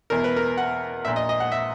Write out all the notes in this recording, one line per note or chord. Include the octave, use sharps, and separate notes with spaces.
E2 B2 A#4
B4
A#4
F#5
A#1 A#2 E5
D#5
D#5
F#5
E5